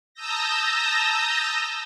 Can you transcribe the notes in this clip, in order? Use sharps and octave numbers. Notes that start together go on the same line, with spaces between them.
A5 A#5 D#6 E6 G6 A#6